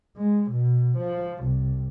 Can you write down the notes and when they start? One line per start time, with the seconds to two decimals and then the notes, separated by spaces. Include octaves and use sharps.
0.17 G#3
0.51 B2
0.97 F3
1.43 C2